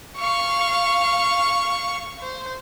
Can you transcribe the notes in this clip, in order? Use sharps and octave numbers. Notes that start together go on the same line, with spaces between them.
F5 C#6
C5